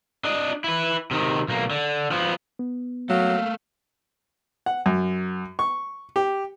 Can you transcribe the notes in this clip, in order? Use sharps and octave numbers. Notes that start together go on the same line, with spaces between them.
D4 D#5
E4 B4
C3 D#3
B1 A#3
D3
F3 B3
B3
F#3 A3 A#3 F5
F#5
F#2
C#6
G4